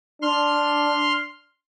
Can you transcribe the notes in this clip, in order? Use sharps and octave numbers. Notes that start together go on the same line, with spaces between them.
D4 C6 F6